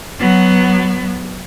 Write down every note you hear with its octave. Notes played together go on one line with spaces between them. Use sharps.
F#3 B3